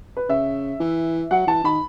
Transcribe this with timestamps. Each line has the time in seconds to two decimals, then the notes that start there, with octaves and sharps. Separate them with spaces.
0.17 B4
0.29 C#3 E5
0.80 E3
1.31 F#3 F#5
1.47 E3 A5
1.64 D#3 B5